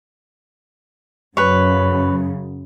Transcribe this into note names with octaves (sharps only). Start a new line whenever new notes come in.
F#2 C#3 B4 C#5